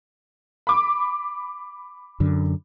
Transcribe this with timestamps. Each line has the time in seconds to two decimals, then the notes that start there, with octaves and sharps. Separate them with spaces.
0.67 B5 D6
2.20 F#2 D3